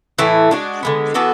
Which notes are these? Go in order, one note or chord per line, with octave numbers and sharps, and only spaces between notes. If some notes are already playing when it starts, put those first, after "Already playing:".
A2 E3 A3
G#3 D4 F#4
D3 G#3 B3
E3 B3 F#4 A4